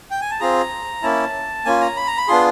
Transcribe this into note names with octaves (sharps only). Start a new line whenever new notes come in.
G5
G#5
A5
C4 F4 G#4 A#5
A#3 C#4 E4 A5
A#3 C#4 F4 G#5
A#5
B5
A#5
B5
B3 D4 F4 G#4 C6